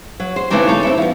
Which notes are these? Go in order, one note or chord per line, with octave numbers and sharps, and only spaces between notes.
F#3
C5
C#3 E3 A3 C4 D4 D#4
D#4 A4 C#5
C4 C#4 E4
F3 B3